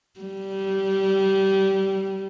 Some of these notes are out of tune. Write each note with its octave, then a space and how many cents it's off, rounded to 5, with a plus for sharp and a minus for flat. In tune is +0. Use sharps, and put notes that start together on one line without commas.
G3 -20